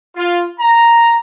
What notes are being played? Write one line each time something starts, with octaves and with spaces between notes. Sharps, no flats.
F4
A#5